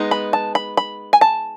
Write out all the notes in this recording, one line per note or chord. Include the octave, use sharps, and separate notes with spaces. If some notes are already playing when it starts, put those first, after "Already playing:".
Already playing: G#3 B3 D#4
B5
A5
B5
B5
G#5
A5